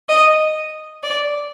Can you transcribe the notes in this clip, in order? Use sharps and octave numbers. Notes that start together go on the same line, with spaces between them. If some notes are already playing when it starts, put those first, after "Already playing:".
D#5
D5